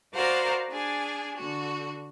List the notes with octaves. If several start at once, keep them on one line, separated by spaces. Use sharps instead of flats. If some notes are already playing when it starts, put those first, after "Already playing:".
F#4 A#4 C5 D5 F5 F#5
D4 G#4 G#5
D3 F#4